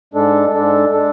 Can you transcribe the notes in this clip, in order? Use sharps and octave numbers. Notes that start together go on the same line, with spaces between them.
G#2 G#3 D4 A4
G#2 G#3 D4 A4
G#3 D4 A4